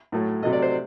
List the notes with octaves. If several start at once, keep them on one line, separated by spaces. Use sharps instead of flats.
A2 F#3 A3
C3 F#3 A3 D#5
D5
C5